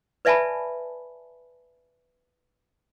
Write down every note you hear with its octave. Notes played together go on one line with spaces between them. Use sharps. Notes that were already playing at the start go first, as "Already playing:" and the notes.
B4 D5 E5 G#5 A5 B5